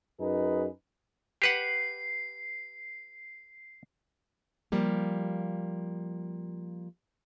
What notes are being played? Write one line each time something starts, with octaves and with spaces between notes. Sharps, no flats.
F#2 D#4 G#4 B4
G4 B4 F#5 C7
F3 G3 A#3 G4